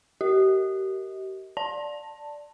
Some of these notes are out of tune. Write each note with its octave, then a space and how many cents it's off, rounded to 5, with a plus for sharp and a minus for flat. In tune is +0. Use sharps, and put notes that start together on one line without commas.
G4 -35 A#4 -10 D#5 +40
D5 +0 A5 +10